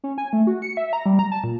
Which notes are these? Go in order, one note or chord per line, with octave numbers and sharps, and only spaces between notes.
C#4
G#5
A3
F#4
C#7
E5
A#5
G3
A#5
A5
A#2